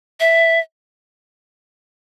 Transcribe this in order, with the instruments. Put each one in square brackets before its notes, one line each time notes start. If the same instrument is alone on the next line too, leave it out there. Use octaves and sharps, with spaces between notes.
[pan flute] E5